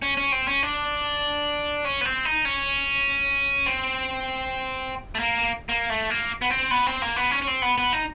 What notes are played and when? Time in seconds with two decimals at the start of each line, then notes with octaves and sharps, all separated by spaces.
0.02 C#4
0.17 C#4
0.32 C4
0.48 C#4
0.63 D4
1.85 C#4
2.01 B3
2.05 C4
2.25 D#4
2.45 C#4
3.66 C4
5.15 A3
5.19 A#3
5.69 A#3
5.90 A3
6.10 A#3
6.42 B3
6.50 C4
6.71 B3
6.87 C4
7.02 A#3
7.16 B3
7.31 C#4
7.42 C#4
7.47 C4
7.62 B3
7.78 B3
7.93 D#4